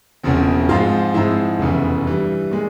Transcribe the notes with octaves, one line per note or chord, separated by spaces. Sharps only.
E1 E2 C#3 F3 C4
G#2 F3 G#3 C4 F4
G#2 F3 G#3 C4 E4
F1 E2 C#3 E3
G2 E3 G3
A#2 G#3